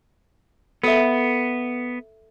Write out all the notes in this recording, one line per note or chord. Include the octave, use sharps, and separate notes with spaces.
B3 A4 E5